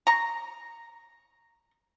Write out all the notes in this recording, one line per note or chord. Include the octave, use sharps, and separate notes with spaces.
A#5 C#6